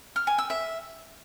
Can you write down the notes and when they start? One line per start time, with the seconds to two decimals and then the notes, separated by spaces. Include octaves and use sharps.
0.16 F6
0.27 G#5
0.38 E6
0.50 E5